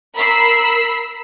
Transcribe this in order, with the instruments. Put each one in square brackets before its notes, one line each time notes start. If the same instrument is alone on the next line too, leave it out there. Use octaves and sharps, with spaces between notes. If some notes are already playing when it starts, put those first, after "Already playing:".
[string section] A#4 B5 E6 B6 C7